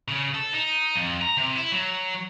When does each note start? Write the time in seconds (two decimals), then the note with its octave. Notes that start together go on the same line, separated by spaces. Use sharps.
0.08 C#3
0.35 A4
0.53 D#4
0.96 F2
1.22 A#5
1.37 C3
1.56 E4
1.72 F#3